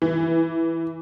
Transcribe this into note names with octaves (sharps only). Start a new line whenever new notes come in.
E3